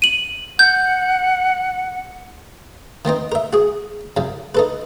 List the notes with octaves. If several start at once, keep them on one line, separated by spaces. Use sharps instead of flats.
D#7 F#7
F#5 G6
D#3 B3 C4 D#4
A#4 E5
F#4 G#4
C2 F#2
D#4 A4 B4